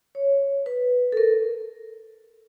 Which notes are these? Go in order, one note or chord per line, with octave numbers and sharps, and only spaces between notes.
C#5
B4
A4
A#4